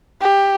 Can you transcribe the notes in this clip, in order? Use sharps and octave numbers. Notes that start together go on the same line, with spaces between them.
G4